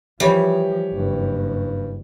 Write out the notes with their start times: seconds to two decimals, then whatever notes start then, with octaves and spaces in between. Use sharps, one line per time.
0.20 E3 F3 G3 G4 C#5
0.93 F#1 G2